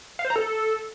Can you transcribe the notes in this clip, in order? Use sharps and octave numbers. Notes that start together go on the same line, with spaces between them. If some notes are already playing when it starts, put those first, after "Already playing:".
F5
C5
A#5
A4